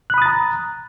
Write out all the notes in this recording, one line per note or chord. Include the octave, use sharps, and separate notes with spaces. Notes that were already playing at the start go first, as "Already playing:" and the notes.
A#5 B5 D#6 F#6 A6